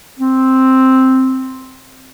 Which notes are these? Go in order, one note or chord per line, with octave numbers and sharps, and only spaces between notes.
C4